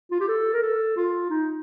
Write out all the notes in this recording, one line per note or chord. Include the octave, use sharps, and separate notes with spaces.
F4
G4
A4
A#4
A4
F4
D#4